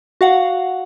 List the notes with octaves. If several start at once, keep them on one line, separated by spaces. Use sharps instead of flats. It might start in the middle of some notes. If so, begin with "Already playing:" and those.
F#4 F5 F#5